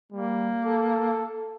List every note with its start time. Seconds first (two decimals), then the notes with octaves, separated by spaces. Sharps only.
0.12 G3 A#3
0.64 A4